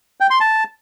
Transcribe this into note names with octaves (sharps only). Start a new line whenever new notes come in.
G5
C6
A5